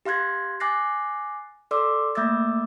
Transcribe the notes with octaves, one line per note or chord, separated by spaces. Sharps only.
G4 F5 C6 F#6 G#6 A#6
G#5 D6 F#6 A6 A#6 C7
A4 D5 C6 D6 E6
A3 A#3 E5 D6 E6 A6